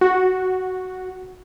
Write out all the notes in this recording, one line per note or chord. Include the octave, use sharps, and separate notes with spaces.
F#4